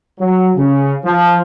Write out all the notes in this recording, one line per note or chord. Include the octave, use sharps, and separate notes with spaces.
F#3
C#3
F3